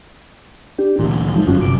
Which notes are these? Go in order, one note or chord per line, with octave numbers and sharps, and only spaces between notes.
D4 G4
D2 A#2 E3
F3 F#3 G#3 D#4
G1 F#2 C#4 F4 F#4
C3 D6